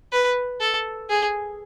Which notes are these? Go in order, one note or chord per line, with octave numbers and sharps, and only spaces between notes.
B4
A4
G#4